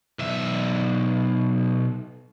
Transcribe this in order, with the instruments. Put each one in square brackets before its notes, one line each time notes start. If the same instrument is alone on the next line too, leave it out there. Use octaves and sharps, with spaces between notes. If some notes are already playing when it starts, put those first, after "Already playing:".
[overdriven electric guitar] B1 E5